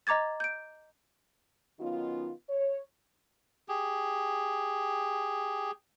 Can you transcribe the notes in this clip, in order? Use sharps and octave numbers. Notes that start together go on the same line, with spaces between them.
D#5 A#5 D6 G#6 A6
G6 D7
D#3 F#3 B3 C#4 D#4 F4
C#5
G4 G#4